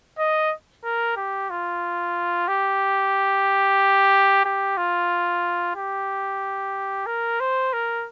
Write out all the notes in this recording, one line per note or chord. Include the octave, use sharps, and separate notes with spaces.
D#5
A#4
G4
F4
G4
G4
F4
G4
A#4
C5
A#4